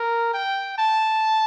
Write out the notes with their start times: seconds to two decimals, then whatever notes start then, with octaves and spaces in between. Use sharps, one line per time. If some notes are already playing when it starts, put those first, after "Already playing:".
Already playing: A#4
0.34 G5
0.78 A5